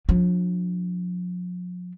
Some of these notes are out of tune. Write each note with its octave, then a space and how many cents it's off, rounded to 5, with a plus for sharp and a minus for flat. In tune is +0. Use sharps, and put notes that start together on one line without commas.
F3 +45 D4 +0